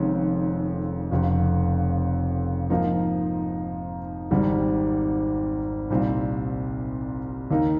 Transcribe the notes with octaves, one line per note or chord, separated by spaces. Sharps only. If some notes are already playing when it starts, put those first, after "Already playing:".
Already playing: F1 F2 D#3 G#3 C#4
F1 F2 C#3
G#2 F3 A#3 D#4
G#1 G#2 D#3 G3
C2 A#2 G3 C4 D#4
D#2 D#3 A#3 D#4